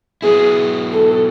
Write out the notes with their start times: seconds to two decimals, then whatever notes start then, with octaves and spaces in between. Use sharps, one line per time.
0.22 F#3 B3 E4 G#4
0.93 A4